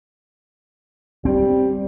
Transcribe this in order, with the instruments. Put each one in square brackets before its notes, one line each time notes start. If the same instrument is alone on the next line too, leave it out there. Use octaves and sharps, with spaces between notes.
[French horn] G3 [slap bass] C4